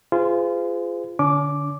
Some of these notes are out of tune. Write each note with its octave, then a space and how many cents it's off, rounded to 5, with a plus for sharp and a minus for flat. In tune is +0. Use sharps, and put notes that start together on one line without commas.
F4 -15 G#4 -10 C5 -40
D3 +0 C#4 +45 D6 +0